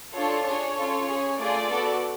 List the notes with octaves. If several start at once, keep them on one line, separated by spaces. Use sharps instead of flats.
D4 F4 A4 C#5
D4 G#4 C#5
C#4 F4 A4
C#4 G#4
A3 F4 G#4 D5
B3 F#4 A4